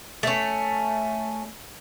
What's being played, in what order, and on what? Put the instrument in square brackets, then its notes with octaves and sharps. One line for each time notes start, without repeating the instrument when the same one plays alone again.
[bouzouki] A3 C#4